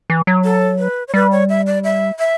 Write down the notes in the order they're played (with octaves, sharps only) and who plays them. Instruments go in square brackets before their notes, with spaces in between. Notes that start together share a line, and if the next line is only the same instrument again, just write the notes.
[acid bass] E3
F#3
[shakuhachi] A4
B4
C#5
[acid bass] G3 [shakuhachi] B4
[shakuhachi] C#5
E5
D5
E5
E5